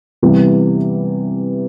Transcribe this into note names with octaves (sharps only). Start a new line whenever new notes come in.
C3 E3 G3 B3 E4